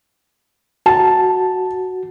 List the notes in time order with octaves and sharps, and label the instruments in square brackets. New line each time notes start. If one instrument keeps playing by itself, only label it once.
[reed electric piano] F#4 [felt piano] A5